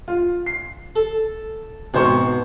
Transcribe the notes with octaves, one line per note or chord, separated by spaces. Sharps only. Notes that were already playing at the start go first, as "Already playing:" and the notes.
F4
C7
A4
G#1 B2 A#4 C5 C#6